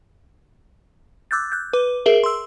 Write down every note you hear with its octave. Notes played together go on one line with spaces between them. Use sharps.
D6 E6 F#6 G6 A6
F#6 G6
B4 D6
G#4 A#4 E5 G7
C6 E6